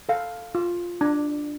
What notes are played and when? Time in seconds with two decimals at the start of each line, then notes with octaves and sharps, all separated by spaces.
0.09 A4 F5
0.55 F4
1.01 D4